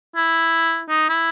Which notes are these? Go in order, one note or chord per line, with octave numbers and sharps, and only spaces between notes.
E4
D#4
E4